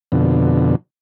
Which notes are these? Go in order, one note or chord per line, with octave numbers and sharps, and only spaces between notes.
F2 B2 D3